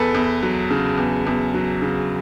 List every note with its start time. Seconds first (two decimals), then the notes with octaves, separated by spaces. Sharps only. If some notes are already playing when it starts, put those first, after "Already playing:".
Already playing: E2 A4 B4
0.15 E2
0.43 F#3
0.70 C#3
0.98 E2
1.27 E2
1.54 F#3
1.82 C#3